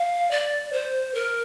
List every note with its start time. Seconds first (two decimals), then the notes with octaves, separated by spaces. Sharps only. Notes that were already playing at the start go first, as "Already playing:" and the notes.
Already playing: F5
0.31 D5
0.73 C5
1.15 A#4